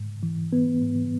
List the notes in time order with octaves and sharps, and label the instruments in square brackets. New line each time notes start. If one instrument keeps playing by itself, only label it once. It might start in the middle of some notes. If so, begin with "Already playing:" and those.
Already playing: [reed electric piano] G#2
E3
B3
G#2